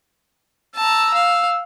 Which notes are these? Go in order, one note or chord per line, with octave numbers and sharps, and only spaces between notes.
A5 A#5 E6
F5